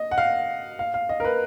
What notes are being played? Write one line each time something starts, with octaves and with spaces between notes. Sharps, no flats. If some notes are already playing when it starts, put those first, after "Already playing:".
Already playing: D#5
F#5
F5
F5
F5
D#5
A#4
B4